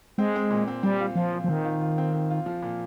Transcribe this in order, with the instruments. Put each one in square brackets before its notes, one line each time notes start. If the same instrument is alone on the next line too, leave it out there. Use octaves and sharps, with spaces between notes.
[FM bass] G#3 [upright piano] C4
[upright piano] C4
A#2
C4
[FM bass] G3 [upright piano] C4
[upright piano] F4
[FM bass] F3 [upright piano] F4
[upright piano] A#2
[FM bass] F3
[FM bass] D#3 [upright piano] C4
[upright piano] F4
F4
C4
C4
F4
F3
A#2